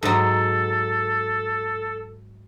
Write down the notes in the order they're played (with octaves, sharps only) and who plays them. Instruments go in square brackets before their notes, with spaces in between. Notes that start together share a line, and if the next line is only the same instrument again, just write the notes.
[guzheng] G#2 F#3 [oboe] A4